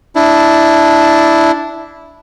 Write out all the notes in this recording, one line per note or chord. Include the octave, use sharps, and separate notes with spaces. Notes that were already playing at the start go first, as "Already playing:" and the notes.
D4 E4